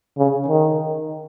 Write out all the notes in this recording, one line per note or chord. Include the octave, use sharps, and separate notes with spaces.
C#3
D#3